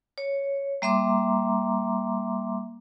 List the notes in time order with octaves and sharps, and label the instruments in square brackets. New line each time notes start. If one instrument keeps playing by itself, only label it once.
[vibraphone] C#5
G3 A#3 E5 A#5 C6 D6